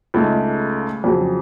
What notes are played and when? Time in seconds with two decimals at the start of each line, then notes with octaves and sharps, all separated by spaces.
0.14 C#2 C#3 A3 D#4
1.04 F2 C#3 F#3